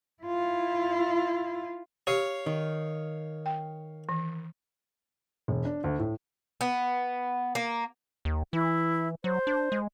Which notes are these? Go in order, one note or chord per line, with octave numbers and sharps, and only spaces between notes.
E4 F4
G4 C#5 F5
D#3
G5
E3
E1
D4
D2
A2
B3
A#3
D#2
E3 E4
F#3 C5
D4
G#3